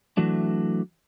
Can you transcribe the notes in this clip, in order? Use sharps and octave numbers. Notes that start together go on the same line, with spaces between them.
E3 F#3 A3 D4